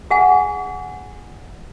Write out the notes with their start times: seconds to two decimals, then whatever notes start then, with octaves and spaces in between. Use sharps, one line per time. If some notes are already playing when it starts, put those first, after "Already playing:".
0.10 G#4 F#5 G#5